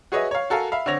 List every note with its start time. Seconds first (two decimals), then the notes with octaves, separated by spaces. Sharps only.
0.12 F#4 G#4 B4 C#5 D#5 E5
0.31 C#5 F5
0.50 F#4 A4 A#4 F5 G#5
0.72 E5 F5 B5
0.86 D3 C4 C#5 A#6 F7